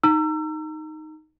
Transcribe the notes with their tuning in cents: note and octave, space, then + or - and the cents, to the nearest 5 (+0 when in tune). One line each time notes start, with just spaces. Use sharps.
D#4 +0 A#5 -25 E6 +30